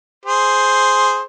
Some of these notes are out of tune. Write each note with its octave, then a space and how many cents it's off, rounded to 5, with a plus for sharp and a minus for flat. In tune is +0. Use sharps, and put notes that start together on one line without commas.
G#4 +5 C5 +0